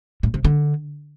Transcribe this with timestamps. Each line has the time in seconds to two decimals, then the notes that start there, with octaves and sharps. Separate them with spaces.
0.23 A2
0.34 C3
0.45 D3